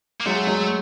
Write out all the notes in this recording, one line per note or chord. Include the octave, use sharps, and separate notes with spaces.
A#3
F#3 G#3 A3
F#3 G#3